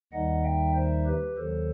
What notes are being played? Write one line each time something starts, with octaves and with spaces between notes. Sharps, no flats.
D#2 D#3 G3 D#4 D#5 F#5
E5 G5
C5 E5
G4 B4
D#2 D#3 F#3 A4 C5